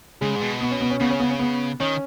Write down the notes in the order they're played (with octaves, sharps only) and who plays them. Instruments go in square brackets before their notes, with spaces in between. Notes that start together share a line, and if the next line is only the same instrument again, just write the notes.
[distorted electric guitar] C#3 [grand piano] G#3
[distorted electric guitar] G#2
B2
[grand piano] B3
C#4
B3
C#4
[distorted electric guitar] C#3 [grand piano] B3
[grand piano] C#4
B3
C#4
B3
[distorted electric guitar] D#3 [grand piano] C#4